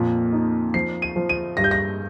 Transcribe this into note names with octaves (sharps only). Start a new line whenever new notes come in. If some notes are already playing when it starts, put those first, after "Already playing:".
Already playing: F2 A#2
D#4
F3 C7
D#7
F3
D#7
G2 A#6
G6
A#6